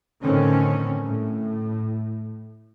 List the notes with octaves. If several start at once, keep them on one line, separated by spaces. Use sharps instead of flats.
A2 D3 D#3 C4 C#4
A2